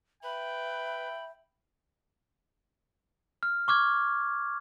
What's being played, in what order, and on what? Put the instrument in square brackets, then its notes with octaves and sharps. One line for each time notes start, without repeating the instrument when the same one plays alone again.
[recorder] B4 [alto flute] E5 [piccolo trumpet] G5 [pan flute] B5
[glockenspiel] F6
C#6 D6 F6 G#6